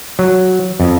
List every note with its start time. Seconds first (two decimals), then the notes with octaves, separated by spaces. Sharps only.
0.19 F#3
0.80 F2